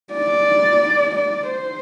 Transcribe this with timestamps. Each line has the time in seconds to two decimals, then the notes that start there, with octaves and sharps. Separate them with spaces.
0.13 D5
1.15 D5
1.49 C5